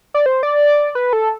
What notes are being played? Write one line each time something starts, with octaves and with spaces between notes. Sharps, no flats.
D5
C5
D5
B4
A4